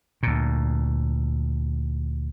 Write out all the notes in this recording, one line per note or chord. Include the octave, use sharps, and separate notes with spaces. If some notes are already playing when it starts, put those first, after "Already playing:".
D2 A#2